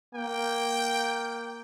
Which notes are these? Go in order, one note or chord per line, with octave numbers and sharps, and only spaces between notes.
A#3 G5